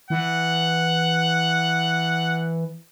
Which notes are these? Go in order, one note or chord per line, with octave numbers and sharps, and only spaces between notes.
E3 F#5